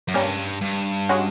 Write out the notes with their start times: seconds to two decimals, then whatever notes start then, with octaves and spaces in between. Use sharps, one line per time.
0.08 F#2
0.14 G2 G3 A#3 C#4
0.62 G2
1.09 G#3 C#4 F#4